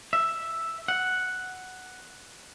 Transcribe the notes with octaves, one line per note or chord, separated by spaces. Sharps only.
E5
F#5